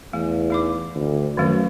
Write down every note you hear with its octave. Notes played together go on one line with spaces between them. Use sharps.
E2 A3 G#5
A3 D#4 D6
D2
F#2 D#3 F3 A3